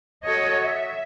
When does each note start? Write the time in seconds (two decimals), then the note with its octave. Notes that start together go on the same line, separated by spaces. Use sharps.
0.23 F#4 A4 C#5 D#5
0.63 E5